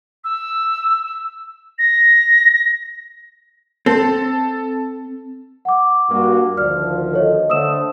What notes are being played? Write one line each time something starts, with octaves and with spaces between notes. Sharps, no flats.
E6
A#6
C4 A4
F#5 D6
G2 A#3 F#4
D2 D#3 F3 D5 F6
A4 C#5 D#5
D3 A3 C5 D#6 E6 E7